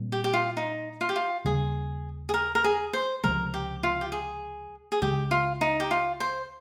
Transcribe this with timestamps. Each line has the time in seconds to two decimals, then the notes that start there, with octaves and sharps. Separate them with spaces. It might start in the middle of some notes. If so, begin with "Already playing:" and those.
Already playing: A#2 G3 C4
0.12 G4
0.24 G4
0.33 F4
0.57 D#4
1.01 F4
1.09 G4
1.16 F4
1.45 D#2 C#3 G3 C#4 G#4
2.29 G#4
2.34 A#4
2.55 A#4
2.64 G#4
2.93 C5
3.24 C#2 C3 F3 G#3 A#4
3.54 G4
3.83 F4
4.01 G4
4.12 G#4
4.92 G#4
5.02 C#2 C#3 G#3 G4
5.31 F4
5.61 D#4
5.80 G4
5.91 F4
6.20 C5